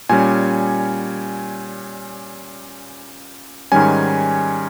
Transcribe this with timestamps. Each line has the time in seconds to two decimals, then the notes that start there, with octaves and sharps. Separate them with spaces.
0.09 A#2 G3 C#4 G#5
3.72 G#2 D#3 G3 C#4 G#5